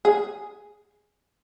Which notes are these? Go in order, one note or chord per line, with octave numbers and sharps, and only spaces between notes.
G#4